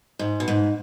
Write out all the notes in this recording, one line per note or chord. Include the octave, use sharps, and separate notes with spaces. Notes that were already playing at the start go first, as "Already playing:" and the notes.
G#2
B2
G#2